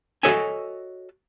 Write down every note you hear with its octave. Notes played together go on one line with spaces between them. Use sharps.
F#4 A4 C#5 D#5 E5 G#5